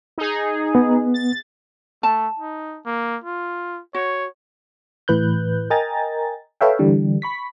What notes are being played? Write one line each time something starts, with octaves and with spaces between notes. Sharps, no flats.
D#4 G#4
B3
A6
A3 A5
D#4
A#3
F4
F#4 C#5
A2 E3 B4 F#6 G6
A#4 D#5 G5 G#5 A#5 A6
A4 B4 C#5 E5 F5 G5
D3 E3 G3
B5 C#6 B6